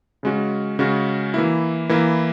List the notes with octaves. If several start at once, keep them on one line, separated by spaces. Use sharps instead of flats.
C#3 G#3 C#4 F#4
C#3 G#3 C#4 F#4
E3 A#3 E4
E3 A#3 E4